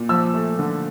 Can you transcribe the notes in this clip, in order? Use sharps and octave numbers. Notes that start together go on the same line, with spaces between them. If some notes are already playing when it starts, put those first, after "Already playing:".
Already playing: A#2
F3 E6
A3
D3